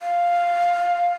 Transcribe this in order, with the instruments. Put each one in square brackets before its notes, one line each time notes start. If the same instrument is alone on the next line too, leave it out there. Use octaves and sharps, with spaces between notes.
[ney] F5